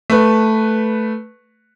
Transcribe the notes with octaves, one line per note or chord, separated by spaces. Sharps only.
A3 B4